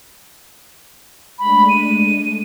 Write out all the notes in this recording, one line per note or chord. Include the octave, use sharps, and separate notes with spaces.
G#3 A3 D4 B5
D#7